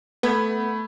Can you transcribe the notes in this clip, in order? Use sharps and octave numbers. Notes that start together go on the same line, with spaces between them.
A3 B3 B5 G#6